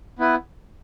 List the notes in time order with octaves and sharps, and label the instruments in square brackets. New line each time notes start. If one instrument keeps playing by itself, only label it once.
[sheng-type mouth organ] B3 E4 B4